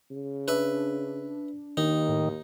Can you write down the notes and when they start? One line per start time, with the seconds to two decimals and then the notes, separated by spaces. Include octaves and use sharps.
0.11 C#3
0.48 D4 B4 E5
1.77 D#2 D#3 D#4
2.09 A2